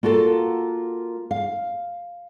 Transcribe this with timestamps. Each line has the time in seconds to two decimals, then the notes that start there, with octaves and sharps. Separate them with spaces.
0.03 A#3 F4 F#4 A4
1.31 F5